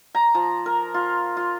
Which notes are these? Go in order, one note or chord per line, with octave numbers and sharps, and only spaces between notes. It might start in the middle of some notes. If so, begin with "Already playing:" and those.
A#5
F3
A#4
F4
F4